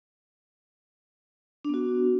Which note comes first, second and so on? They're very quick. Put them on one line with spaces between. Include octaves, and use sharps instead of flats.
D4 B3 F#4